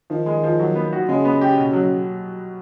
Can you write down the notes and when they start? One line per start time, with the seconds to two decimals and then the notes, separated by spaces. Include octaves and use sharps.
0.10 D#3 F3
0.26 G#3
0.43 F3
0.59 F#3
0.75 B3
0.92 F#4
1.08 C#3 G#3
1.25 B3
1.41 G4
1.58 B2
1.73 F#3